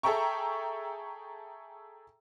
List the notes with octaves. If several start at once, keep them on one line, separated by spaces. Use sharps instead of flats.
G#4 A4 E5 G5 A#5 C#6